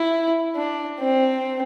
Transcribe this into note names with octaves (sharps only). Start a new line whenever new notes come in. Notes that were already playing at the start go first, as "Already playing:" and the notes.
Already playing: E4
D4
C4